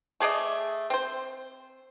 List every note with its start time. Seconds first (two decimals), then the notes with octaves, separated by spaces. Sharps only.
0.20 A3 G#4 D5 D#5
0.90 C4 C5